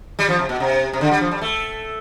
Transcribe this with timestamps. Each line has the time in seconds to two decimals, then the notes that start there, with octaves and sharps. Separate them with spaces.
0.19 G3
0.29 F3
0.39 C3
0.49 B2
0.60 C3
0.93 C3
1.01 D3
1.11 G3
1.21 F3
1.31 G3
1.41 A3